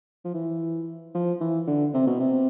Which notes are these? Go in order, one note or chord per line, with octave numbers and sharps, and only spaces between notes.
F3
E3
F3
E3
D3
C3
B2
C3